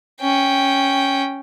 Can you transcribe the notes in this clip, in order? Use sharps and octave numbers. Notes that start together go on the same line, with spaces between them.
C#4 G5